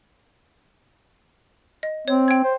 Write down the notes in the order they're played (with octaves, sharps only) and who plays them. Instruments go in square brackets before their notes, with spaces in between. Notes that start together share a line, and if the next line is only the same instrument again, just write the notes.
[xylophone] D#5
[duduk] C4 [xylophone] C#5
[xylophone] G5 G#6
[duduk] C5